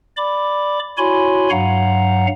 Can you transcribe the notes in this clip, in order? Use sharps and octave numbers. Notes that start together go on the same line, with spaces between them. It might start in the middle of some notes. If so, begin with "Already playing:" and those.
D5 B5 D6
E4 F#4 C#5 G#5 B5 C6
G2 F#3 F5 F#5 A#5